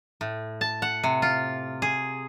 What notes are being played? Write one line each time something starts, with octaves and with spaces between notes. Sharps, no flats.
A2
A5
F#5
C3
F4
G#4